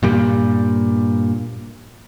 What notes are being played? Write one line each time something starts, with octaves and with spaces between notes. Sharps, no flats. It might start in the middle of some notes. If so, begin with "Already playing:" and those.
G2 A#2 G3